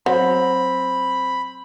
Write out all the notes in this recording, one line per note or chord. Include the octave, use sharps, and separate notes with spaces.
F#3 C4 B5